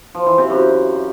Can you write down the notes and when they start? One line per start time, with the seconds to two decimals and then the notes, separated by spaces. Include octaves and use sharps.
0.15 F3
0.26 E3
0.38 C3
0.50 F#2